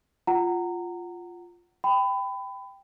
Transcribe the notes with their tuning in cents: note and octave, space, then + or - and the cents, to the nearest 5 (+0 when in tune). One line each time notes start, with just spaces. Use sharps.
F4 +0 F#5 +15 A#5 -20
G5 +0 B5 +25